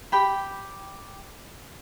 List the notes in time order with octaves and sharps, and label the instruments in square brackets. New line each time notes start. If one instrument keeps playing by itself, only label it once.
[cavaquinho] G4 G5 B5